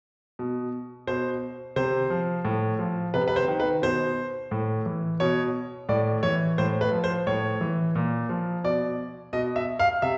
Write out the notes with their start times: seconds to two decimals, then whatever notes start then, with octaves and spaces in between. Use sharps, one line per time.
0.39 B2
1.07 B2 C5
1.76 C3 C5
2.10 F3
2.45 A2
2.79 F3
3.14 C3 B4
3.28 B4
3.36 C5
3.48 D#3
3.60 B4
3.82 B2 C5
4.51 A2
4.86 E3
5.20 B2 C#5
5.89 A2 D5
6.23 E3 C#5
6.58 A2 C5
6.81 B4
6.92 F3
7.04 C5
7.27 A2 C#5
7.61 E3
7.96 A#2
8.29 F3
8.64 B2 D5
9.33 B2 D#5
9.56 E5
9.79 F5
10.02 C3 E5